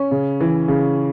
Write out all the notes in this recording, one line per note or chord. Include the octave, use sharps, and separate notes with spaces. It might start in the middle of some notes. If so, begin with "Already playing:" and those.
Already playing: C#4
C#3
E3
C#3